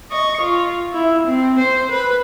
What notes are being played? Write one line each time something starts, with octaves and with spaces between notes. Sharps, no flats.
D#5 C#6
F4
E4
C4
C5
B4